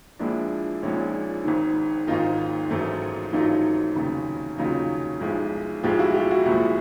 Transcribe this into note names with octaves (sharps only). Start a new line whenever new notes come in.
A#1 A#2 F3 G#3 D4 E4
A#1 A#2 F3 G#3 C#4 D#4
G#1 G#2 D#3
G#1 G#2 D#3 D#4 F4
A1 G#2 D#3 F#3 A3
A1 G#2 D#3 F#3 A3 D#4 F4
F1 D#2 C#3 F#3
F1 D#2 C#3 F#3 D#4 F4
B1 A2 F3 G#3
B1 A2 F3 G#3 F4 G4
E4 F#4
F4 G4
E4 F#4
C2 A#2 F3 G#3